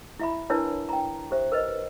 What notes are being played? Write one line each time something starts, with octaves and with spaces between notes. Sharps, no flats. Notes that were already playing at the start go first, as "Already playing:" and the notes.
E4 E5 B5
D4 E4 A#4 B4 C#5 A5
G5 A#5
G4 C5 E5
A#4 B4 D#5